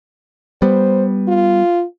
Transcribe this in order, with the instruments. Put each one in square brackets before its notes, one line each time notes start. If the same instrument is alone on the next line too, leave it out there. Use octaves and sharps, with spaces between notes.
[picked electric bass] G3 B3 [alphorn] C5
[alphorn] F4